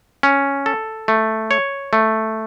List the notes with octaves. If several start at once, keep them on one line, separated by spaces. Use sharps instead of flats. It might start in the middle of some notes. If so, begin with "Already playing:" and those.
C#4
A4
A3
C#5
A3